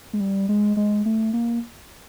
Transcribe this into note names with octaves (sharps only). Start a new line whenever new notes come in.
G#3
G3
G#3
G#3
A3
A#3